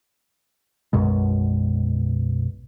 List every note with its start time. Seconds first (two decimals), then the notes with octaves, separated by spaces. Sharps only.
0.93 B1 F#2 B2 G#3